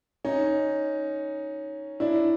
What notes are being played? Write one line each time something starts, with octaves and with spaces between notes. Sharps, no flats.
C#4 D#4
D4 E4